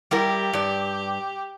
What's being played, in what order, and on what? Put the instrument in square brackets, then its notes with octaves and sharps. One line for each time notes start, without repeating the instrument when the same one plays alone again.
[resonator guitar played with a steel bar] G3 E4 A#4 [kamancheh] G4
[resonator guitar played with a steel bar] G2 D5